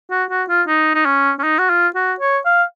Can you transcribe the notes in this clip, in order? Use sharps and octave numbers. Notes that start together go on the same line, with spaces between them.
F#4
F#4
F4
D#4
D#4
C#4
C#4
D#4
F#4
F4
F#4
C#5
F5